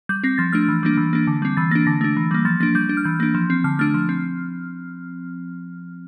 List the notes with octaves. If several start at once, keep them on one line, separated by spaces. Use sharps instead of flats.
G3 G6
C4 A#6
F3 A6
A3 D4 F6
E3
G3 A#3 D4
E3
A#3 D4
D3
G3 C4
E3 A6
A#3 D4 A#6
D3 A#6
A3 D4
E3
G3 A#3
F3 A6
A#3 D4 A6
G3 G6
D4
F6
E3 G6
A#3 D4
F3
C4
D3 F6
A3 D4 F6
F3
C4